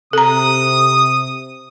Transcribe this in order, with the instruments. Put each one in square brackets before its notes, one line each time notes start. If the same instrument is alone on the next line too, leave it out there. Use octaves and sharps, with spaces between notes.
[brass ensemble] C3 [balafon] A4 A#5 [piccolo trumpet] D#6